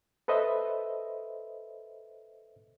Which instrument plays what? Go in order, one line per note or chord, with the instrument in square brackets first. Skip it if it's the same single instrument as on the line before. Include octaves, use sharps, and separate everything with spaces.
[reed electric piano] A4 B4 C5 D#5 E5